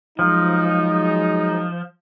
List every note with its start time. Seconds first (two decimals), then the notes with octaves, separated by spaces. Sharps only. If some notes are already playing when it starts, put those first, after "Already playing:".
0.19 F3 F#3 G#3 D#4